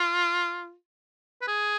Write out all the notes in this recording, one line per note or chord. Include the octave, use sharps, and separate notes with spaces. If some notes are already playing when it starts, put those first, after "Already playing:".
Already playing: F4
B4
G#4